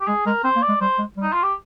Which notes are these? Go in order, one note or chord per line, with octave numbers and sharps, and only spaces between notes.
G4
G#3 G#4
G#3 A#4
C4 C5
A#3
D5
G#3
G3 C5
G#3
G3
D#4
F4
G4